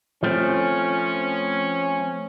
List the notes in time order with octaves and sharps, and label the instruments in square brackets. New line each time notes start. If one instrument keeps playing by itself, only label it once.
[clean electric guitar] F3 A3 C4 [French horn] C#4